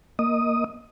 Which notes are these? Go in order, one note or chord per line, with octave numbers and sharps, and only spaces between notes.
A#3 D#5 D#6